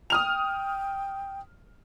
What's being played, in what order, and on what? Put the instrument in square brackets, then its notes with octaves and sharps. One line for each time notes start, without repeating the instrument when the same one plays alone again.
[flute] G5 [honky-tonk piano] D#6 F6 F7